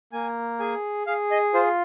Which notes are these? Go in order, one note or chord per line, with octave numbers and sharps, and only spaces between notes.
A#3 G#5
G#4 G#5
G#4 F5
D#5
F4 C5